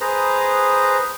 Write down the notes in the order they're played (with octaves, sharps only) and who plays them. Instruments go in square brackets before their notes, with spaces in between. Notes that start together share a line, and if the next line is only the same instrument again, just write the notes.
[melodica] G#4 B4 C5 A#5